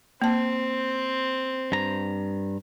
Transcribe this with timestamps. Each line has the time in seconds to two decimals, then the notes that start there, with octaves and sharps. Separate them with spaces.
0.22 A#3 C4 A5
1.72 G2 A#5